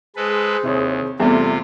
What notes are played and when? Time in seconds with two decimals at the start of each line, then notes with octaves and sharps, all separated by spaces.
0.16 G#3 G#4 A4 B4 C5
0.63 D#2 C3 E4 C#5
1.20 E2 C3 G3 A3 C4 F4